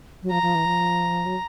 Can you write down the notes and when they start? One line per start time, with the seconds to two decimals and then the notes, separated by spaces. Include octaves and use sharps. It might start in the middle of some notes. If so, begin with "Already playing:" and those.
0.23 F#3
0.31 F3 A#5
0.42 F3
0.55 E3
0.66 F3
1.26 F#3